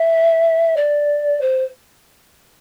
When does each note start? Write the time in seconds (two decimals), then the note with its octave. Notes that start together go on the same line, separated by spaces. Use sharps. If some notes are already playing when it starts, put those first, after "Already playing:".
Already playing: E5
0.76 D5
1.40 C5